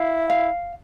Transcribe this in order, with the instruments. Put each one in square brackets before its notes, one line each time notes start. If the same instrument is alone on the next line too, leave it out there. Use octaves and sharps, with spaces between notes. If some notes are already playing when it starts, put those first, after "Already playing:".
Already playing: [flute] E4 [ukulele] F5
[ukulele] F5